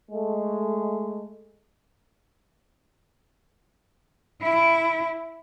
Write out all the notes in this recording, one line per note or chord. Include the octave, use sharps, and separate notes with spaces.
G#3 A3
E4